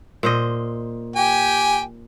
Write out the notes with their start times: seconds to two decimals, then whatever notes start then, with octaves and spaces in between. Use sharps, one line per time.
0.23 A#2 C5 D#5
1.16 G4 G5 G#5